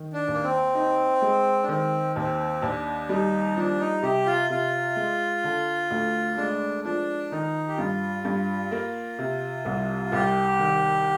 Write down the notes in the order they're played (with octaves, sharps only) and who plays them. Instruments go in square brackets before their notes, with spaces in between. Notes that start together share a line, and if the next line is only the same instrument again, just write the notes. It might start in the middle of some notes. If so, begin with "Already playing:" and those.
Already playing: [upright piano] D#3
[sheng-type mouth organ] D4
[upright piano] D#2
[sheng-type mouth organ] A#3
C4
[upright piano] D#4
G#3
[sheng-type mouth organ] D4
[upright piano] D#3 [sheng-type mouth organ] C4
[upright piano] D#2 [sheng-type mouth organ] C4
[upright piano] D#2 [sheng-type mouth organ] D4
[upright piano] G3 [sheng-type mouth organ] D#4
[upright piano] F3 [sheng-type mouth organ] D4
[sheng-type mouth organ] D#4
[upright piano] C3 [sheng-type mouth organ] G4
[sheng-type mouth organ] F4
[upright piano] C3 [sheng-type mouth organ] F4
[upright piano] G#3
D3
D2
[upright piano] G#3 [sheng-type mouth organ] D4
[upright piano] F3 [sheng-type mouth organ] D4
[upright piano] D#3 [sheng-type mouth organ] D#4
[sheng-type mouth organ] G4
[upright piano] G2 [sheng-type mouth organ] F4
[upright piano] G2
A#3
C3
C2
[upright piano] C2 [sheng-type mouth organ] G4
[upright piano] D#3